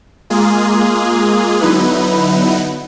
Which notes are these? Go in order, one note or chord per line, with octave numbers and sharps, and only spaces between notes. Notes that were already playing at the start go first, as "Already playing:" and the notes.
G#3 A#3 F4 G#4
D3 F#3 B3 D#4 E4 B4